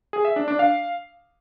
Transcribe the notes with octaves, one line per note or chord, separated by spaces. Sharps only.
G#4
E5
D4
D4
F5